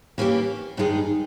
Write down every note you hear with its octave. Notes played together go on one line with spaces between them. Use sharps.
E3 A#3 C#4 G4
G2 D#3 G#3 D#4 G#4